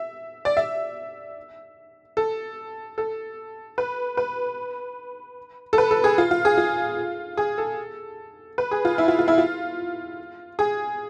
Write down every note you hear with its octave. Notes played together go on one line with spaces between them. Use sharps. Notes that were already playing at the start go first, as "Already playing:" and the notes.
Already playing: E5
D5
E5
A4
A4
B4
B4
A4
B4
A4
G#4
F4
F4
G#4
F4
G#4
A4
B4
G#4
F4
E4
F4
F4
E4
F4
G#4